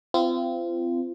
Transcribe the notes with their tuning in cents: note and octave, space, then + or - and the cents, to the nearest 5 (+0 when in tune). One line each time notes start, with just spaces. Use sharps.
C4 -25 F4 -35